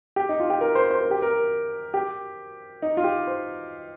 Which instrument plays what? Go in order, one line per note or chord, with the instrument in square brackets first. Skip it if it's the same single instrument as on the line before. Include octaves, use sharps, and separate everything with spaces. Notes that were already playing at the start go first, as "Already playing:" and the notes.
[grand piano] G4
D#4
F4
G4
A#4
C5
C5
A#4
G4
A#4
G4
D#4
F4
G4
C5